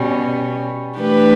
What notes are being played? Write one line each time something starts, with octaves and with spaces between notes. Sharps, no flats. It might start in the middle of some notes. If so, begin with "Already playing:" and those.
Already playing: B2 G3 C#4
E3 A3 D4 G4 B4